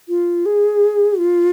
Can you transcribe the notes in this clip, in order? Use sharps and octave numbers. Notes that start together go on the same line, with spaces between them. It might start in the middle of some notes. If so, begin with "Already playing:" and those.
F4
G#4
F4